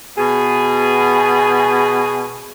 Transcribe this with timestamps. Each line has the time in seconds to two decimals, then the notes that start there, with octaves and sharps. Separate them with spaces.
0.17 B2 G#4